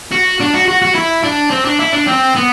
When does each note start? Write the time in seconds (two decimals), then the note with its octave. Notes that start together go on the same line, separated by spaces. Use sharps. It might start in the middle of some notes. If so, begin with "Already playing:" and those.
0.11 F#4
0.40 D4
0.54 F#4
0.68 F#4
0.82 F#4
0.95 E4
1.24 D4
1.51 C4
1.65 D4
1.79 E4
1.92 D4
2.07 C4
2.35 B3